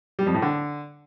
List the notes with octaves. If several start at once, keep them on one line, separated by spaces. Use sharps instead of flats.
G3
F2
A2
D3